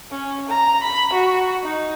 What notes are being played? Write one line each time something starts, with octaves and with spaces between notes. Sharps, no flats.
C#4
A#5
B5
F#4
D#4